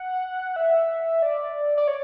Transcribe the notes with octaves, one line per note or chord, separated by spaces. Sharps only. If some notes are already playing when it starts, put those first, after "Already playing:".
Already playing: F#5
E5
D5
D5
C#5